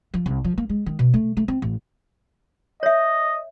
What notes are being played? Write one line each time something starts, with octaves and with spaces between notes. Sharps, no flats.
F3
C2
F3
A#3
G#3
D#3
B2
A3
A3
C4
A1
C#5 D#5 E5